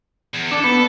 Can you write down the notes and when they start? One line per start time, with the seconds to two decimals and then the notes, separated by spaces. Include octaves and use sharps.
0.34 E2
0.51 D4 A4
0.64 B3